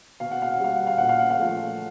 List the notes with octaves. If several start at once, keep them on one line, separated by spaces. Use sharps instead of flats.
B2 F5
F#5
F5
F#5
G3 F5
F#5
F5
A#2 F#5
F5
F#5
F5
F3 A3